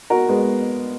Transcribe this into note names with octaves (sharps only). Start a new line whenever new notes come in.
F#4 A#4
G#3 B3